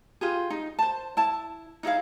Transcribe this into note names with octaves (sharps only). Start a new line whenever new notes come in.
F4 G4 G#4
D#4
C5 A5
E4 A5
D#4 E4 G#4 F5